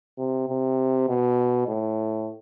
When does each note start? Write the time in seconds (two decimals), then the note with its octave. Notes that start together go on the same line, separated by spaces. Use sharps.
0.18 C3
0.49 C3
1.09 B2
1.68 A2